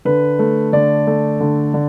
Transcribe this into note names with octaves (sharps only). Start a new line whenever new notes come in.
D3 B4
A3
D3 D5
A3
D3
D3